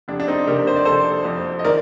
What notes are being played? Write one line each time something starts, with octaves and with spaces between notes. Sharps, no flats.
F1 D4
D4
C4 D#4
C3 G4 A#4
C5
D5
F1 A4 C5
F2
D#5
D#3 A#4 D5